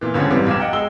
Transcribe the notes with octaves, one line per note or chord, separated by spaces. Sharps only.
A#2 E3
C#2 G2 D3 F3 C#4
G#2 C3 E3 G3
A#1 G2 F5 D6 G#6 E7
D#5 F#5 G5
G#3 G5 E6 G7